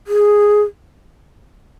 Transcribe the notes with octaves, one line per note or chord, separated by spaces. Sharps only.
G#4